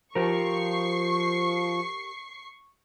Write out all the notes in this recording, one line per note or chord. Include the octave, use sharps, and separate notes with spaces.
F3 G4 A#4 C#6 C7